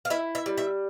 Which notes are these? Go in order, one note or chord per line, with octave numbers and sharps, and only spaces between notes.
F5
E4 E5
E5
G3
E5